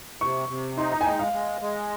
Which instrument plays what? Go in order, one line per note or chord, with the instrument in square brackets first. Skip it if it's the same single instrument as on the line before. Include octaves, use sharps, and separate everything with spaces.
[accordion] C3 [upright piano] C#6
[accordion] C3
[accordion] D#4 [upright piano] C6
[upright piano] A#5
G#5
[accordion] G#3 [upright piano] G5
[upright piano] F5
[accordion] G#3
G#3